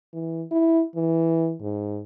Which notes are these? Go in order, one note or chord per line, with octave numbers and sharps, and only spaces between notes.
E3
E4
E3
G#2